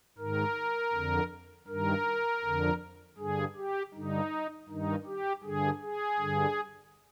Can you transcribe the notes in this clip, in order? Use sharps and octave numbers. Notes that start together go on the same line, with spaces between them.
G#2 D#3 A#4
F2 D3
G2 D#3 A#4
F2 D3
G2 D3 G#4
G4
G2 D3 D#4
G2 D#3 D#4
G4
G2 D3 G#4
G#4
G2 D3